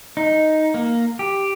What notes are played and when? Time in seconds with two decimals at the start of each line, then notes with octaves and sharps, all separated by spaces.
0.17 D#4
0.74 A#3
1.19 G4